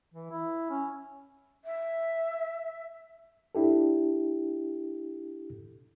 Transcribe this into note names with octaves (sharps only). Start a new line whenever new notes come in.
E3
E4
C#4
E5
D4 E4 G4 A4